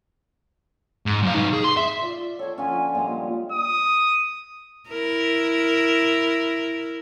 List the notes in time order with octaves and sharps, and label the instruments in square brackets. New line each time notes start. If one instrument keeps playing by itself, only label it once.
[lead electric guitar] G#2
F#2 F5
D#4 B4
G#4
C6
E5
[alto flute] F4 [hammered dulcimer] D5
[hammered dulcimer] A4 G#5 [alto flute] C#5
[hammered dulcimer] D3 F3 C#4 [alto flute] G#5
[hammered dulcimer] A#2 G3 G#3
[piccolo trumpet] D#6
[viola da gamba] E4 A#4